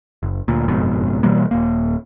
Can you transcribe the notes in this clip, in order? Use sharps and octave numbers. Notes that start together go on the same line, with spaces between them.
F#1
D2 A#2
F#1 F2 G#2 B2
B2 E3 G3 A#3
D#1 A#3